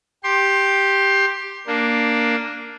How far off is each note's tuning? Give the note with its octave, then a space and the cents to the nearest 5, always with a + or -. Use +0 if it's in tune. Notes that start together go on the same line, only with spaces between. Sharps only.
G4 +0 C6 +20
A#3 +0 D4 +0